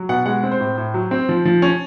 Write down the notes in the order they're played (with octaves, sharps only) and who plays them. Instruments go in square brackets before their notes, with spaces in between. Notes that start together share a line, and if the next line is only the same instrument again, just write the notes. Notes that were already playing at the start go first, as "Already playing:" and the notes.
Already playing: [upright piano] F#3
B2 F#5
G#3 F#5
C4
C5
A2
A2
F#3
C4
F3
F3
C#4